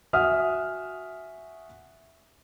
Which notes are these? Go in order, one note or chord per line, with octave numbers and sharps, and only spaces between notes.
F#4 E5 F#5 G#5 D#6 F6